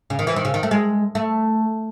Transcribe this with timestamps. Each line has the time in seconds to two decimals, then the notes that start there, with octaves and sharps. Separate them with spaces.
0.10 C#3
0.19 D#3
0.27 E3
0.36 D#3
0.45 C#3
0.54 D#3
0.63 A3
0.71 G#3
1.15 A3